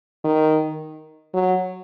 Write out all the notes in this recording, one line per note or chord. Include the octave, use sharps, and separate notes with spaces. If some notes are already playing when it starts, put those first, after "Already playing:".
D#3
F#3